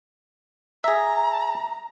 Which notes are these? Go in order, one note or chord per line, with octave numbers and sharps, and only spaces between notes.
G#4 E5 A#5